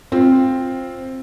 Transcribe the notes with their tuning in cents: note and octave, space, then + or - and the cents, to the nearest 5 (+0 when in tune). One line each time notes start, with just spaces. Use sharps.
C4 +10 F4 +0